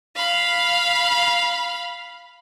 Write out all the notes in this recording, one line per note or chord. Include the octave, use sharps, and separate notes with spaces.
F5 B5